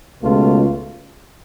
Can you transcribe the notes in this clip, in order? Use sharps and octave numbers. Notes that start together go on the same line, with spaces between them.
C#2 B2 A3 F4